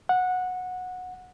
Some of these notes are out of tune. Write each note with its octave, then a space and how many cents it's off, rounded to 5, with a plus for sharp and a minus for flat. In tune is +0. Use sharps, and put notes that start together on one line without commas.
F#5 -15